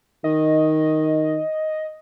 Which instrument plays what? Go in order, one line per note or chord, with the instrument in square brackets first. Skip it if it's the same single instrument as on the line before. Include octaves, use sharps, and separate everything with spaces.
[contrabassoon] D#3 [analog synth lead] D#5